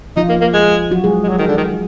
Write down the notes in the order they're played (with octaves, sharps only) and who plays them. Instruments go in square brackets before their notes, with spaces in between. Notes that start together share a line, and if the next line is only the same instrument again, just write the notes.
[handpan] F3 F4 [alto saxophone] D#4
[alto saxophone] A#3
A#3
G#3
[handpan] F#3 F#4
G#3 G#4
[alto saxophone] G#3
F#3
D#3
D3
D#3